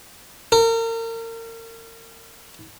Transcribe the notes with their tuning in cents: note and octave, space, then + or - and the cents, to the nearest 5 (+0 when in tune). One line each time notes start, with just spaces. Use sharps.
A#4 -35